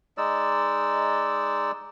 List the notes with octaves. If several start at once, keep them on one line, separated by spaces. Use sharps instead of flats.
G#3 D#4 D5 E6